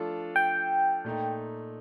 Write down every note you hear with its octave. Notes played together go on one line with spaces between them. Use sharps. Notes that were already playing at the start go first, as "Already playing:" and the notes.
Already playing: F3 A3 D4 F4 A4
G5
A#2 A3 D#4